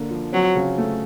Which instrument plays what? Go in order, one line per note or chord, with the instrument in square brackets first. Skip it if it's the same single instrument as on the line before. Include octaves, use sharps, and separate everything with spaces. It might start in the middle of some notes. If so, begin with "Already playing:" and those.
Already playing: [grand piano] D3 A#3 D4
F3
[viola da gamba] F#3 [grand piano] C4
[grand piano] C#3
A3